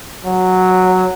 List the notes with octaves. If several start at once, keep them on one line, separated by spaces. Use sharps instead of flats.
F#3